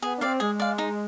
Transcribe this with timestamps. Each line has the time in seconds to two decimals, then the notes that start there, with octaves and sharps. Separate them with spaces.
0.02 B3 G#4
0.16 D4
0.21 C4 D5 F5
0.40 G#3 G#4
0.60 D5 F5
0.78 D#4